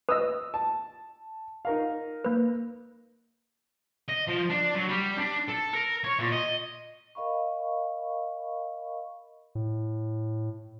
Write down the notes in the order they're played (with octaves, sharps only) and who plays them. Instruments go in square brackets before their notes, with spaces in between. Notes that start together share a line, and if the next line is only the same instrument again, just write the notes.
[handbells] B4 D#5 [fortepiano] D#6 E6
[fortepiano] A5
D#4 A#4 F5
[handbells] A#3 B4
[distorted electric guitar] D#5
F3
D4
F#3
G3
D4
A4
A#4
C#5
A#2
D#5
[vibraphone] A#4 D#5 F5 B5 C#6
[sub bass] A2